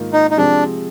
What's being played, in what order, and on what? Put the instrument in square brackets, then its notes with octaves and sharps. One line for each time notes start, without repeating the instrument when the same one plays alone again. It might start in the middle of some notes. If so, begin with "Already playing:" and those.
Already playing: [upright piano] G#2 D#3 A#3 F4
[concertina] D#4
D#4
[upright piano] C3 F3 G#3 C4 [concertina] D4